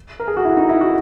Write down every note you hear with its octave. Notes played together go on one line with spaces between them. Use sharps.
A#4
G#4
F#4
E4
D#4
E4
F#4